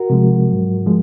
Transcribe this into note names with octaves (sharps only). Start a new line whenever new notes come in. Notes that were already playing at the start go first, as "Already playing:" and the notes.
Already playing: F#4 A#4
C3 F3 G#3
G#2 F#3
F3 G#3